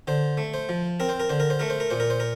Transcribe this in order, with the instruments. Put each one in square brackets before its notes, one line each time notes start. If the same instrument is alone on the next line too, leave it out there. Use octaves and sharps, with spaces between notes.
[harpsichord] D3 C5
A3
C5
F3
C4 A#4
C5
A#4
D3 C5
A#4
C5
A3 A#4
C5
A#4
A#2 C5
A#4
C5
A#4